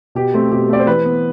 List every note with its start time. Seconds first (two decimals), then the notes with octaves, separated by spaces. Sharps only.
0.15 B2 G4
0.34 A3 C4
0.52 B2 G4
0.69 A3 C4 D5
0.80 C5
0.87 E3 B4
1.05 B3